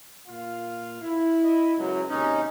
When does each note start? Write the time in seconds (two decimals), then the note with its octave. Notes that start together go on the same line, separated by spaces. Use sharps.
0.28 A#2 F4 F5
1.02 E4
1.44 D#5
1.78 C#2 F#2 F#3
2.10 D#2 C3 C#4 D#4